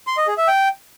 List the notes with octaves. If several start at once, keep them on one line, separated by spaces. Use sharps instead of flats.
C6
D#5
G#4
E5
G5